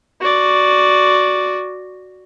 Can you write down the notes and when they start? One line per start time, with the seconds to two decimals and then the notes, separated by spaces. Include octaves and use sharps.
0.20 F#4 D5